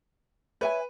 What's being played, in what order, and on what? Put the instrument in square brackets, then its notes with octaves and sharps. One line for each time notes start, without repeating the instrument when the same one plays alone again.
[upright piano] B4 [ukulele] C#5 E5 G#5